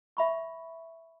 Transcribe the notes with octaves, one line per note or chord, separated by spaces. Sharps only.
E5 B5 C#6